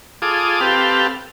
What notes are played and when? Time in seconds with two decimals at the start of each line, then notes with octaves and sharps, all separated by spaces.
0.22 F4 G#4 A4 D6 D#6
0.61 C4 G4 A4 B4 F5